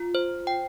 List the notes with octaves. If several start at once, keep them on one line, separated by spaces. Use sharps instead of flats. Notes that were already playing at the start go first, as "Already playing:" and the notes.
Already playing: F4
C5
G5